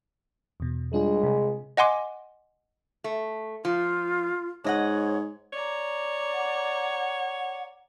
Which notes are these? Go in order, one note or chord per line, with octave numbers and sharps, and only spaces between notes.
E2 B2
G3 G#3 D4 F4
C3
D#5 F#5 G#5 C6 D6
A3
F3 F4
G#2 D4 C#5 D#5 F#5
C#5 D5 A#5
F#5